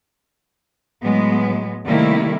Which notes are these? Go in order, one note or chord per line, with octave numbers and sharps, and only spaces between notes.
A2 F#3 G#3 B3
C3 D#3 G3 A3 A#3 E4